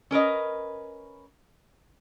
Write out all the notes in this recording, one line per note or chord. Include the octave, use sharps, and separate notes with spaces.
C#4 A#4 B4 D#5